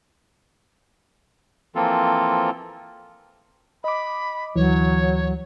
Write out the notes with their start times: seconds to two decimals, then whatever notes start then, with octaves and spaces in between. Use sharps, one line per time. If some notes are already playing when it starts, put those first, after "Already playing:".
1.75 E3 F3 A#3 C4 F4 A4
3.84 D#5 B5 D6
4.56 D2 E3 F#3 C#5